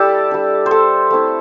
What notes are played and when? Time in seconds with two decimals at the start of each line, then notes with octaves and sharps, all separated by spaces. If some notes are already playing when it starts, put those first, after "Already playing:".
Already playing: G3 E4 G4 A4 D5 A5
0.31 G3 D4
0.66 C5
0.71 A4
1.11 A3 C4 E4